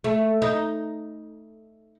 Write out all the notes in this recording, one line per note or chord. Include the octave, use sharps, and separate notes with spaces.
A3
D#4